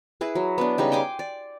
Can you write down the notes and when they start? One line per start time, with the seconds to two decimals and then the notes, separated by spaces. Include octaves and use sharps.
0.21 E4 G#4 B4
0.35 F#3
0.58 B3 D4
0.78 C#3 G3 D#4
0.92 G5 G#5 C6 D6
1.19 D5